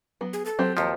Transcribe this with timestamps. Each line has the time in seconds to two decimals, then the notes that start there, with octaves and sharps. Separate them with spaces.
0.21 F#3 B3
0.33 G#4
0.46 A4
0.59 F#3 C4 G4
0.77 D#2 F3 A#5